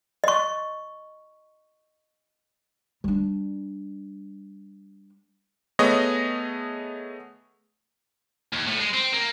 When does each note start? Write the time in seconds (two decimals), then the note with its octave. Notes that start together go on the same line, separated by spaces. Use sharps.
0.24 D#5 C#6
3.04 G3 D4
5.79 A3 B3 G#4 C#5 D#5 A#6
8.53 D#2
8.67 A2
8.80 G#3
8.94 C4
9.13 A#3